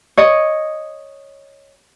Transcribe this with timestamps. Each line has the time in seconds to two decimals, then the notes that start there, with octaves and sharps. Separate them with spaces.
0.17 C#5 D#5